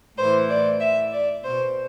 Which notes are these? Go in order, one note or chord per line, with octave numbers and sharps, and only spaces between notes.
A2 E3 C5
D5
E5
D5
B2 C5